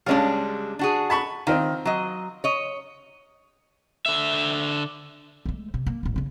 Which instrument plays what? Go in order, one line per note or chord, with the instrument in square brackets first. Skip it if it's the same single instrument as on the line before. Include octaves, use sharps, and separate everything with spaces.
[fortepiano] C#2 C#4 F5 [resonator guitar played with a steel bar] G3 G#3 D4
[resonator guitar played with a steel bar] D4 F#4 G#4
[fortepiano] A5 B5 C#6
[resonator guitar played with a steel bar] D#3 [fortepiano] C4 D#4 F4
[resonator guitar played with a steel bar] F#3 D#5
C#5 D#5
[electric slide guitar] D3 E5
[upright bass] G#3 A3
C3
A#3
D1 A1
C#3 C#4